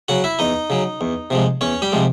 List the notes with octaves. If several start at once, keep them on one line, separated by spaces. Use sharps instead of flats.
C#3 F#3 F#4 F#5
E4 E5
E2 D#4 D#5
C#3 F#3
E2
C3 F3 G#3
E2 C#4 C#5
G3 G4
C3 F3 G#3